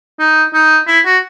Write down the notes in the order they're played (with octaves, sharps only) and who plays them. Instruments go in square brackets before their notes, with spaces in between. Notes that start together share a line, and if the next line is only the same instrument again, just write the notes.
[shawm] D#4
D#4
E4
F#4